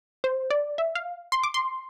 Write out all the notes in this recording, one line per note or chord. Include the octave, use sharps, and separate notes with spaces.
C5
D5
E5
F5
C6
D6
C6